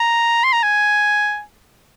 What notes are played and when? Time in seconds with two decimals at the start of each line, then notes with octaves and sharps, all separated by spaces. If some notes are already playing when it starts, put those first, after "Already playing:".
Already playing: A#5
0.44 C6
0.52 A#5
0.63 G#5